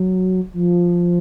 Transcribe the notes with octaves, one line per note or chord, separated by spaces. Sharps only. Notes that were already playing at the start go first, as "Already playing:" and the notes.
Already playing: F#3
F3